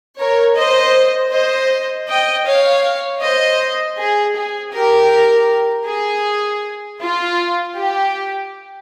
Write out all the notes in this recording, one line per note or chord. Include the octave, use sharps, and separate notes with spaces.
A#4 C#5
C5 D#5
C5 D#5
D#5 G5
C#5 F5
C5 D#5
G#4
G#4
G4 A#4
G#4
F4
G4